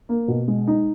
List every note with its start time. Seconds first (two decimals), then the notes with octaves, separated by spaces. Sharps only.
0.09 A#3
0.28 B2
0.48 G#3
0.67 D#4